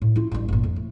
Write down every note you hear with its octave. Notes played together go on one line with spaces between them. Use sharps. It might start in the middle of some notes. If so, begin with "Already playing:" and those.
A2
E4 F4
A1 G2
G1 A#2
F2
A2